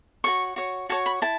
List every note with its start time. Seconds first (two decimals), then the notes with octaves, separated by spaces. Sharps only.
0.24 F#4 A4 C#5 C#6
0.56 F#4 C#5
0.89 F#4 C#5 A5
1.06 B5
1.22 E4 A5